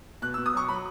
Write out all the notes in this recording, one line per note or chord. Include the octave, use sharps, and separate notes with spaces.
B2 F#6
E6
B2
D#6
F#3 C#6
F#3 B5